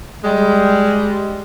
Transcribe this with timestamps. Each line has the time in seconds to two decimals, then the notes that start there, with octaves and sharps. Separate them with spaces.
0.24 G3 G#3